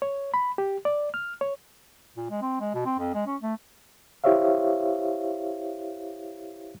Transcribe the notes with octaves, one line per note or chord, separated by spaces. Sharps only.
C#5
B5
G4
D5
F6
C#5
A#2
G#3
C4
G#3
B2
C4
F2
G#3
C#4
A3
E4 G4 C5 C#5 E5 F5